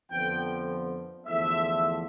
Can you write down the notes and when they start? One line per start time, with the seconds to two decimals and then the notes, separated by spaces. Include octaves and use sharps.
0.11 F2 D3 F3 B3 G5
1.26 E2 D3 F3 A3 E5